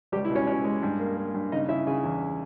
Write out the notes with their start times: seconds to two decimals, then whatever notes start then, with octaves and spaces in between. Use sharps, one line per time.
0.12 C#2 G3 G4
0.25 E4
0.30 B2
0.35 C#4 C#5
0.47 B2 C#4 C#5
0.64 G#3
0.83 G2
1.00 A#3
1.17 A#3
1.34 G2
1.52 C#3 D#4 D#5
1.69 C#3 E4 E5
1.87 C#3 G#4 G#5
2.04 E2